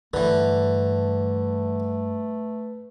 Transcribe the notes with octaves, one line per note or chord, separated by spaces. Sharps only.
G2 D3 E3 A3 B4